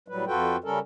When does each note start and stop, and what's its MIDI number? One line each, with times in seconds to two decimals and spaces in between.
0.08 0.25 45
0.08 0.25 54
0.08 0.25 55
0.08 0.25 71
0.27 0.56 41
0.27 0.56 65
0.27 0.56 66
0.27 0.56 69
0.27 0.56 71
0.27 0.56 79
0.64 0.79 49
0.64 0.79 55
0.64 0.79 61
0.64 0.79 69
0.64 0.79 70